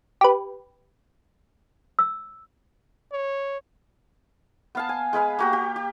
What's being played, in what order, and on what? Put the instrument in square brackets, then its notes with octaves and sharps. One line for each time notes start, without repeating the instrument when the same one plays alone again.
[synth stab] G4 B4
[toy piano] E6
[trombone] C#5
[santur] B3 F5 A5
G#5
G#3 G#4 B4 F5
A#3 F#4 G4
G4
G4